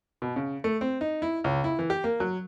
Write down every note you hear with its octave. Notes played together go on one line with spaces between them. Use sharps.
B2
C#3
A3
C4
D#4
E4
C#2
E4
E3
G4
A#3
F#3